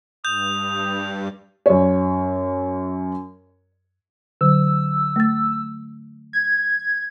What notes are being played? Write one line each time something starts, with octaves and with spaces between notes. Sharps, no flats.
G2 D#6 G6 F7
F#2 C#5
D3 F#3 E6
A3 A6
G#6